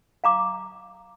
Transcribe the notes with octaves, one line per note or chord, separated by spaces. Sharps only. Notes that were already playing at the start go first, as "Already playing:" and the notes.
F5 A#5 D6